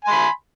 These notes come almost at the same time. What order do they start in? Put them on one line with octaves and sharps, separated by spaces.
G#5 C6 B5